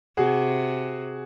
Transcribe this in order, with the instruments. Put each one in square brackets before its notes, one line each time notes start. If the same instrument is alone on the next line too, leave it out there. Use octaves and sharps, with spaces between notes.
[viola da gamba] C3 [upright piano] F#4 G#4